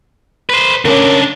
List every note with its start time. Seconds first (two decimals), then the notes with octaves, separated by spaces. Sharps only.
0.50 B4 C5
0.85 C#3 C#4 D4 A#4